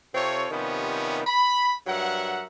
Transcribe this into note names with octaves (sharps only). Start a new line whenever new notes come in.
C3 C4 F4 A4 C#5
C3 D#3 F3 G3 B3 C#4
B5
G2 F#3 A#4 E5 F#5